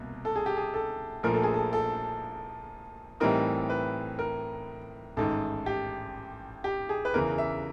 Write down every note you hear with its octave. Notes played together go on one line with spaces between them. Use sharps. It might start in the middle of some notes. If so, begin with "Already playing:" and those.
Already playing: C2 B2 A#3
A4
G#4
G4
G#4
A4
A#1 A#2 F3 A3 A#4
A4
G#4
A4
A4
A2 E3 G3 C4 D#4 A#4
B4
A#4
A1 G#2 D#3 A4
G4
G4
G#4
B4
E2 C#3 E3 A#4
E5